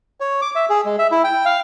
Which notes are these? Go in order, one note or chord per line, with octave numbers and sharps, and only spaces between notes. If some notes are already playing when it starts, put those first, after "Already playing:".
C#5
D6
E5
G#4
G#3
E5
E4
G5
F5